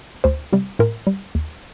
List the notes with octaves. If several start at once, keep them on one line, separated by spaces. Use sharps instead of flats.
D2 C5
C3 G3
A2 A#4
G3
D#2